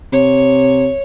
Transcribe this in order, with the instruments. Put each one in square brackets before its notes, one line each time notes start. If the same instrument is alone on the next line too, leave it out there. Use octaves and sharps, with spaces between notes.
[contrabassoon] C3 [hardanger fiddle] C#5